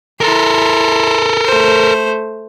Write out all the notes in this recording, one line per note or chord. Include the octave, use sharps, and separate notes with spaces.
E4 A4 A#4 C6
A3 C5